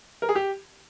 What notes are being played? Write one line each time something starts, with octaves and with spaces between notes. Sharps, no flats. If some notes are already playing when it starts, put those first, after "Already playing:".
A#4
G#4
G4